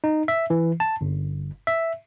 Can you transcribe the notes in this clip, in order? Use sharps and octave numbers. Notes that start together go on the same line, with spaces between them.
D#4
E5
E3
A5
G1
E5